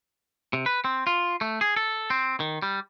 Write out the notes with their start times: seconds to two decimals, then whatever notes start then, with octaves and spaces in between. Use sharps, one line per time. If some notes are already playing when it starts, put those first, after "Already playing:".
0.53 C3
0.66 B4
0.84 C4
1.07 F4
1.41 A3
1.61 G#4
1.76 A4
2.10 C4
2.40 D#3
2.62 G3